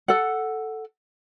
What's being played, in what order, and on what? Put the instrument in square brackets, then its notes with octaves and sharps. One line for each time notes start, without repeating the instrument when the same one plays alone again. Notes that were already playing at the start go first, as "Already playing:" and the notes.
[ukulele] A4 F#5